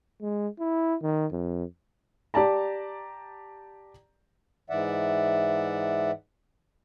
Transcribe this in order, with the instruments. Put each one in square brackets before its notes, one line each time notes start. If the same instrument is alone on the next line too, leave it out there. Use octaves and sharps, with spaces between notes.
[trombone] G#3
E4
D#3
F2
[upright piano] G4 D5 A5 A#5
[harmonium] G#2 E3 D5 E5 F#5